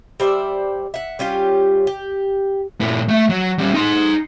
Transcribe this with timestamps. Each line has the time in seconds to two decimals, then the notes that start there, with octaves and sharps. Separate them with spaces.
0.20 G3 C5 D5 E5
0.94 E5 F#5
1.19 G3 C#4 F4 G4
1.87 G4
2.81 A#2 E4
3.08 A3 E5
3.29 F#3
3.58 G3 C#4
3.74 D#4 C6